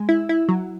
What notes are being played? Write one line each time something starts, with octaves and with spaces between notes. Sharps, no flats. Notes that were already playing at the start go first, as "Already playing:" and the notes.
Already playing: G#3
E4
E4
F#3